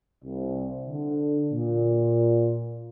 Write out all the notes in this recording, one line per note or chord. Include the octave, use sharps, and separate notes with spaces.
C2
D3
A#2